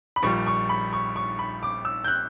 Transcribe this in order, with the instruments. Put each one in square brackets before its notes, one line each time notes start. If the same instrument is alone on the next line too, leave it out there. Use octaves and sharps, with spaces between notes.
[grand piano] B5
A#1 A#2 G3 C#6
C#6
B5
C#6
C#6
B5
D6
E6
G6
F#6